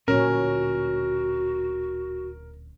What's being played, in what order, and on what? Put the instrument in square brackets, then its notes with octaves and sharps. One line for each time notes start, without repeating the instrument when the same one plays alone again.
[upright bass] D1 D3 [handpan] A#2 C#4 [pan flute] F#4 [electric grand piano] A#4